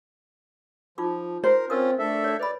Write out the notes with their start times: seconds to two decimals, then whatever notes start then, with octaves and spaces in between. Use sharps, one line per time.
0.98 F3 D#4 F4 D6
1.44 A#4 C5
1.70 C4 C#4 F4 A#4 D#6
1.99 A3 D4 A4 E5
2.24 C#5 D5
2.39 B4 D5 B5